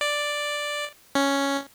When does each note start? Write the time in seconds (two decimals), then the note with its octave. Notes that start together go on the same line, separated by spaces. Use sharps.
0.01 D5
1.15 C#4